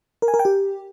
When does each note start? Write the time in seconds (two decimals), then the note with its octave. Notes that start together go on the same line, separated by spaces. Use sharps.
0.22 A#4
0.28 G#5
0.34 A#4
0.39 G5
0.45 G4